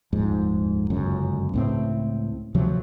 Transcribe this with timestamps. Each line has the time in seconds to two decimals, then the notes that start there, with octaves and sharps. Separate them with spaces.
0.12 D#1 F2 G#2
0.90 G1 C#2 F#2
1.54 C#2 A2 C4
2.54 D2 C3 F3 F#3